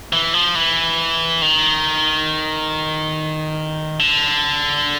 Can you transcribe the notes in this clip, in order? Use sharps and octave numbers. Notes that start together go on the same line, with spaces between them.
E3
F3
E3
D#3
D3